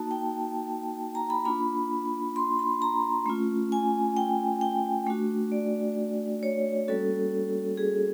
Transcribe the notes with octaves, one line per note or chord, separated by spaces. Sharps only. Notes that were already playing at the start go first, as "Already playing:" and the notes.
Already playing: A#3 D#4 F#4 A5
G5
A#5
B5
A#3 D4 F4 B5
C6
B5
A#5
A3 C#4 F4
G#5
G5
G5
A3 D4 F#4
D5
C#5
G3 A#3 C#4 F#4 A4
G#4